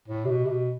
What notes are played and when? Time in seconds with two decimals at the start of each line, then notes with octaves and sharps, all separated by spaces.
0.08 A2
0.25 C3
0.30 B2
0.45 C3
0.50 B2